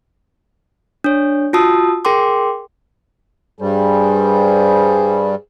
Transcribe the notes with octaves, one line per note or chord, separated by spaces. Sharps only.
D4 C#5
F4 F#4 A5 D#6 E6
G#4 A#4 G5 C6 D6
G2 G3 G#4 C5